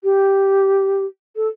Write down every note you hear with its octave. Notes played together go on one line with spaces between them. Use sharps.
G4
A4